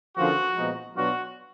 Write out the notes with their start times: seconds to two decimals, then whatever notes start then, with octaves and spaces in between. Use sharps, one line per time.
0.17 D3 F3 A#3 C#4 F4 F#4
0.56 A#2 F3 G#3 B3 D#4
0.96 B2 F#3 B3 D4 F4 F#4